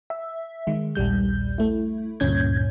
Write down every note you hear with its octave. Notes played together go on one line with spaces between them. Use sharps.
E5
D#3 G#3
A#1 D#2 G3 G6
A3 E4
D2 G2 A#2 C#4 G6 G#6